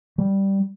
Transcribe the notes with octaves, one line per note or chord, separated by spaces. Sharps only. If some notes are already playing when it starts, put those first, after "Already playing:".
G3